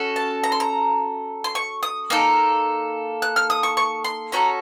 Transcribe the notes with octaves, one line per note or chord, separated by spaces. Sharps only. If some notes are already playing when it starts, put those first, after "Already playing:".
Already playing: C#4 F#4 A4
A5
A#5
C6
A#5
C6
C#6
D#6
A#3 D#4 A4
F#6
F6
D#6
C#6
C#6
C6
C#4 F#4 A4 A#5